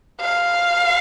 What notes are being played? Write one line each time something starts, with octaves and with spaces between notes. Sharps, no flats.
F5